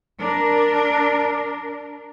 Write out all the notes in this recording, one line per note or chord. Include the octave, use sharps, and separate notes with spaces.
D4 A#4